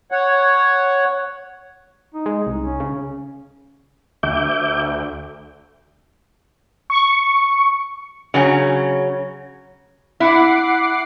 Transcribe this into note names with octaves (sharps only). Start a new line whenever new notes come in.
C#5 F#5
D#4
G#3
C2
C#4
C#3
D2 E5 D6 G6
C#6
C#3 F#3 C#4
E4 F#5 D6 C7